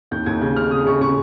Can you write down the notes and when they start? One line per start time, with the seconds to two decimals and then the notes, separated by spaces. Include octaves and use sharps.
0.11 D#2 G6
0.26 D#2 G#6
0.41 C#3 G6
0.56 C#3 F6
0.71 C#3 D#6
0.87 C#3 C#6
1.01 C#3 C#6